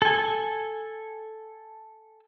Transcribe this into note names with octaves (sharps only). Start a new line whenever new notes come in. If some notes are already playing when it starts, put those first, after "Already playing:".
A4 G#5